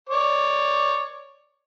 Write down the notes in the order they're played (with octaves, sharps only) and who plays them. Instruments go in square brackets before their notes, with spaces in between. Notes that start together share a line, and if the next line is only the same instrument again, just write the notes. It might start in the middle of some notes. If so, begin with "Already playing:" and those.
[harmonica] C#5 D5 D6